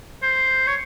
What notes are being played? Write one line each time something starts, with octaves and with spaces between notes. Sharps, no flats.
C5
C#5